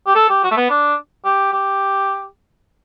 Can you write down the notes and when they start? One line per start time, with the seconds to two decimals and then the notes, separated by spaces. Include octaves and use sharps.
0.07 G4
0.16 A4
0.29 G4
0.44 F#4
0.51 A3
0.57 B3
0.70 D4
1.25 G4
1.52 G4